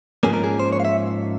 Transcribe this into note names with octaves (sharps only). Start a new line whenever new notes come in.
G#2 F3 A#3 C#4 G#4
A#4
G#4
C5
C#5
F5
E5